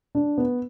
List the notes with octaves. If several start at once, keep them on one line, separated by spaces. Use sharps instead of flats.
D4
B3